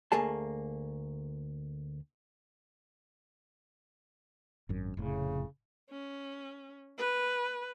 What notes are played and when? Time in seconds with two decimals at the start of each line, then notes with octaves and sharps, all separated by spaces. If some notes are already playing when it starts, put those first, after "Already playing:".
0.12 D2 A3 A#3 G#4 A5
4.69 G#1 F#2
4.97 F1 A2 C#3
5.90 C#4
6.97 B4